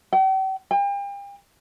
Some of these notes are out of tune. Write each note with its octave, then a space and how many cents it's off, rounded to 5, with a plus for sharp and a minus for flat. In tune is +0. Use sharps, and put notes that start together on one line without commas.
G5 -45
G5 +40